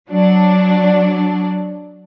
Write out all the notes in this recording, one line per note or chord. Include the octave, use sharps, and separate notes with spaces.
F#3 D4